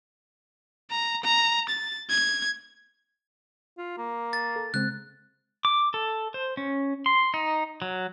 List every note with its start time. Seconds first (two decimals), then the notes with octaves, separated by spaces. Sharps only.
0.91 A#5
1.24 A#5
1.69 A6
2.10 G#6
3.78 F4
3.98 A#3
4.33 A6
4.56 A4
4.74 C#3 G#3 C4 F#6
5.65 D6
5.94 A4
6.34 C5
6.57 C#4
7.06 C6
7.34 D#4
7.82 F#3